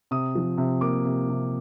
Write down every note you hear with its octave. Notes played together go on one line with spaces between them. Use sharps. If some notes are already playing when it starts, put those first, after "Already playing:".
C3 D#6
F3
C3
A#3 D6
C3
C3